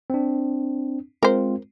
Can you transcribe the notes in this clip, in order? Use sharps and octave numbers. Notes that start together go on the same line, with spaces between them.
C4 D4
G#3 C4 F4 A#4 C5